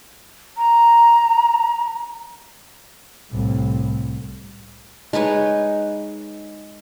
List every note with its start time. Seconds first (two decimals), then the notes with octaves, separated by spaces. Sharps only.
0.58 A#5
3.30 C2 A2
5.13 G#3 D#4 B4 C#5